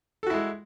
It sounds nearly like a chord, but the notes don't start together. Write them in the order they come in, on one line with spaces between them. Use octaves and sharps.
A4 F#4 E4 G#3